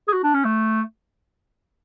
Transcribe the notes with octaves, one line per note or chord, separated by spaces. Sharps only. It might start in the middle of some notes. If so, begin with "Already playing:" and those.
G#4
F#4
D4
C#4
A3